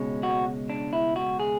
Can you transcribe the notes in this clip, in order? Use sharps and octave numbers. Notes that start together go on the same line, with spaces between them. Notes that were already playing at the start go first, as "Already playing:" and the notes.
Already playing: C#2 B2 G#3 C#4
F#4
D4
E4
F#4
G#4